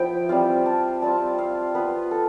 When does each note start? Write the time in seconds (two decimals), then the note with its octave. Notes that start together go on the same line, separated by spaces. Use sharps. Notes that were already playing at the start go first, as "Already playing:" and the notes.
Already playing: F3 B3 E4 E5 G5
0.29 G3 C4 F4 F5
0.66 A5
1.02 G3 C4 F4 A5
1.38 F5
1.74 B3 F4 B4
2.11 A4